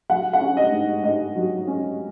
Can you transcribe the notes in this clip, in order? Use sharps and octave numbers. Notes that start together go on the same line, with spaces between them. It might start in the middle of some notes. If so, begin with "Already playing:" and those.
F#3 F#5
F#5
C#4
D#5
G#2
G#2 D#5
F#3
C#4